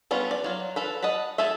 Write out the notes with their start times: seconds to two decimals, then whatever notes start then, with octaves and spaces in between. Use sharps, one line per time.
0.11 G3 B3 C#4 D4 F4
0.31 D5
0.44 F#3 F4
0.76 F4 A4 B4
1.02 D#5 F#5 A5 B5
1.38 F4 G#4 A4 E5